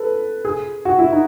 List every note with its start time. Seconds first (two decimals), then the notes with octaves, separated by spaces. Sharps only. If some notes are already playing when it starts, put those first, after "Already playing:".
Already playing: A4 B4
0.45 G#4
0.85 F#4
0.99 E4
1.12 D#4